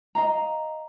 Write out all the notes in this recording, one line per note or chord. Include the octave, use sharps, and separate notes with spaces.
D#5 F5 A#5